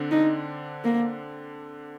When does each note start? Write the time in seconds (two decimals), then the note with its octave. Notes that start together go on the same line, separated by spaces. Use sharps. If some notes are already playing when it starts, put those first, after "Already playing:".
Already playing: D3 C4 D4
0.11 D#4
0.84 A#3